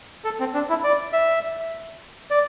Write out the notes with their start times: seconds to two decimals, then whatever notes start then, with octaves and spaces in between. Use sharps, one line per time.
0.25 A4
0.40 C4
0.54 D4
0.70 E4
0.84 D5
1.13 E5
2.30 D5